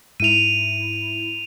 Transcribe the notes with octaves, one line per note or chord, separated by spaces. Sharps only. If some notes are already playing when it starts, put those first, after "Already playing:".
G#2 E4 D#7 F7